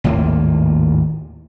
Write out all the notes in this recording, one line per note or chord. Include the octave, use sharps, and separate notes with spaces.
G#1 D#2 A2 A#3